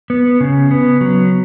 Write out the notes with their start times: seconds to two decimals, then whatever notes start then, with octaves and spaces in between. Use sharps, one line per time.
0.10 B3
0.40 C#3
0.71 B3
1.01 F#3